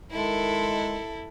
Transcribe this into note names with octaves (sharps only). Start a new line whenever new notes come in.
D#3 G#3 E4 A4